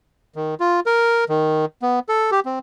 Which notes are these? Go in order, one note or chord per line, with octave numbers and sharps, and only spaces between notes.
D#3
F4
A#4
D#3
B3
A4
G4
C4